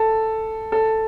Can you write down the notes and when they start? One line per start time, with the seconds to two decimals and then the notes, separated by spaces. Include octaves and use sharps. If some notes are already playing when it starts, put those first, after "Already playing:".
Already playing: A4
0.72 A4